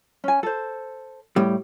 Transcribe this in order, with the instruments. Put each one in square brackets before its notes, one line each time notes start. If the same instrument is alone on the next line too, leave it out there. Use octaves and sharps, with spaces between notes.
[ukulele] C#4 G#5
A4 C5
[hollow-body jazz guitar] A2 G3